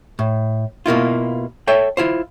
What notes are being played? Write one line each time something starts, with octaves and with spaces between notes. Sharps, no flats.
A2
B2 A#3 E4 F4
A4 C#5 E5 G5
E4 F4 C5